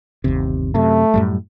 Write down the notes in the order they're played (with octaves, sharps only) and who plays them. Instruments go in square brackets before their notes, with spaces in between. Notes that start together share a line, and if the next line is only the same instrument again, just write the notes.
[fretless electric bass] G1 D#2 C3
[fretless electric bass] F#2 C3 [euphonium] A3
[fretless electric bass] F#2 A2 G3